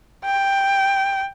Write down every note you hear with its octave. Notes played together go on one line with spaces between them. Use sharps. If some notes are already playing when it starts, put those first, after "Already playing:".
G5